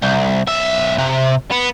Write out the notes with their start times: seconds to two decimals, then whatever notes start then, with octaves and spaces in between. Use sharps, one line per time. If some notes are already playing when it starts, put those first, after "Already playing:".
0.03 C2
0.48 B1 E5
0.98 C3
1.51 B3